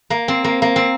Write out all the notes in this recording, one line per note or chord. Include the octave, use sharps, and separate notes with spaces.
A#3
C4
A#3
A#3
C4